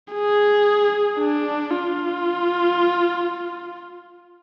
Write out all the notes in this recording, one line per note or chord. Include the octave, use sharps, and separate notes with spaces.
G#4
D4
F4